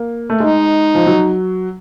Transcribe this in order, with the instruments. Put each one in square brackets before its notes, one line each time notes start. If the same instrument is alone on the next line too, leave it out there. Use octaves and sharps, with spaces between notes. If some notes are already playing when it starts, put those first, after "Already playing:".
Already playing: [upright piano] A#3
A3
[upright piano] G#3 [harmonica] D#4
[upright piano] F3
F#3